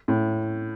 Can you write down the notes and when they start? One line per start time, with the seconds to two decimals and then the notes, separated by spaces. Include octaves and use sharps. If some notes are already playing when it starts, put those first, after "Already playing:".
0.08 A2